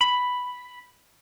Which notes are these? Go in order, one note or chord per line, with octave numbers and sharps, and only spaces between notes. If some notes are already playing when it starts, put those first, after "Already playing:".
B5